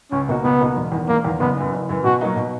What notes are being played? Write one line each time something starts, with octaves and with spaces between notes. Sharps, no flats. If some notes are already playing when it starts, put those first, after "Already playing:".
C#2 C#4
B2 A#3 D#4 F#4
C#2 B3
B2 A#3 D#4 F#4
E1
E2 D#3
E1 A#3
E2 D#3
F#1 B3
F#2 E3
F#1
F#2 E3
B2 F#4
F#3 A#3 D#4
B2